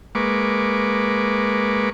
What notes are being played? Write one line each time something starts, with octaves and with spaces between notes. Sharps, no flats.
G#3 A#3 B4 C#6 D6